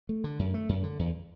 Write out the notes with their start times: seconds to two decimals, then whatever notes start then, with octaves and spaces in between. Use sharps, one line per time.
0.09 A3
0.24 D3
0.39 F#2
0.54 A3
0.69 F#2
0.84 D3
0.99 E2